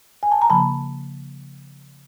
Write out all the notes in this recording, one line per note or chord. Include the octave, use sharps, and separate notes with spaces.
G#5
A5
A#5
C#3 F3 A#3 A5 B5